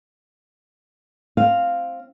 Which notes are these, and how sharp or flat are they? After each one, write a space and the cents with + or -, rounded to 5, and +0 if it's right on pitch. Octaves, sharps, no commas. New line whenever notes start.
C4 +10 F5 +0